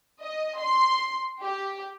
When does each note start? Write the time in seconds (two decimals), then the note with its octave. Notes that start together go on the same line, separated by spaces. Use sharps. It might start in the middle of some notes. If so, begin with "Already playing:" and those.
0.22 D#5
0.59 C6
1.42 G4